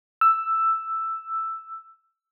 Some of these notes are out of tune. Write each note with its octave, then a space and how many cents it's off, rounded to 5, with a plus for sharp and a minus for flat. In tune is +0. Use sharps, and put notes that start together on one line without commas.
E6 +5